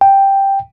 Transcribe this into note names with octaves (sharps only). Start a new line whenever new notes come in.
G5